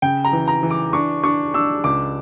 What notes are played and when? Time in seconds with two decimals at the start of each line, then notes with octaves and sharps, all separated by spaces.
0.02 C#3 G5
0.24 A#5
0.33 E3
0.48 A#5
0.63 E3
0.70 D6
0.93 D4 C#6
1.23 D4 C#6
1.54 D4 E6
1.84 C#2 D6